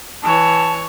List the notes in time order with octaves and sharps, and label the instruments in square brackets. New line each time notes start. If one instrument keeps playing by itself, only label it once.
[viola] E3 C#5 [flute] A5